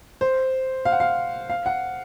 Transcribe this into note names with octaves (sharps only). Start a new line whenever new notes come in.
C5
F5
F#5
F5
F5
F#5